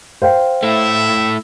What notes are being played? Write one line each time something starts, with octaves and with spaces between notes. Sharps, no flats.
C5 F5 G5
A3 E4 E5